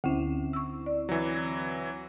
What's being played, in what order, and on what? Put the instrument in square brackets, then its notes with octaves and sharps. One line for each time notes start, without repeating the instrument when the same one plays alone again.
[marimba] D2 C#4 [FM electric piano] D3 C4 E4
[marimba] C#6 E6
D5
[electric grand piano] E3 F#3